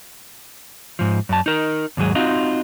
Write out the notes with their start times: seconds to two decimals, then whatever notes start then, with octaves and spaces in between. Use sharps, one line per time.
0.99 G#2 F3
1.29 F#2 A5
1.46 D#4 A#4
1.97 D#2 G#2 F#3 G#4
2.15 C4 D#4 F4 F#4